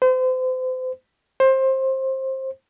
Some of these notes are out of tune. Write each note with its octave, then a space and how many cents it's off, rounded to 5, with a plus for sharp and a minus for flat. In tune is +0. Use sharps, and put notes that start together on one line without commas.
C5 -35
C5 +20